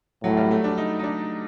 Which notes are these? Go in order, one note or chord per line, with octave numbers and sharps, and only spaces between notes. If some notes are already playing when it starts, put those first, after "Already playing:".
A2 F#3
G3
A3
D4
D#4
D#4
D4